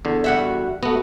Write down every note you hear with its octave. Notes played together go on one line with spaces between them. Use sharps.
E2 D3
G3 F#4 E5
A3 B3 F#4